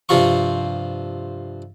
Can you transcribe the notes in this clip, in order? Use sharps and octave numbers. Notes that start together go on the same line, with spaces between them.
G2 C3 F3 F4 F5 C#6